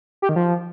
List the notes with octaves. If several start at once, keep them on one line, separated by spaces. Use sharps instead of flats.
G4
D#3
F3